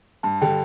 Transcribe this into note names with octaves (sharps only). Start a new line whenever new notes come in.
G2 A5
D3 G3 G5